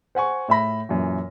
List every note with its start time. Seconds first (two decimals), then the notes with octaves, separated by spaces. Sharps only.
0.15 C5 F#5 G#5 C#6
0.48 A2 E5 B5 A#6
0.89 F#2 A#2 E3